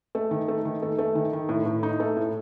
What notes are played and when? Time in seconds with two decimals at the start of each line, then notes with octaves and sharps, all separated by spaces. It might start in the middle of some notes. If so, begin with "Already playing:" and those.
0.15 A3
0.31 D#3
0.48 A3
0.65 D#3
0.82 A3
0.98 A3
1.15 D#3
1.33 D#3
1.49 A2
1.66 A2
1.83 D#4
2.00 A3
2.17 A2